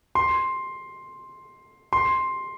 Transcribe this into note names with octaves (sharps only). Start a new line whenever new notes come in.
C6
C6